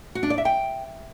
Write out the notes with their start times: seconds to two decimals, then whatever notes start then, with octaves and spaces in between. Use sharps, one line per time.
0.15 F#4
0.23 D4
0.30 D5
0.38 E5
0.45 G5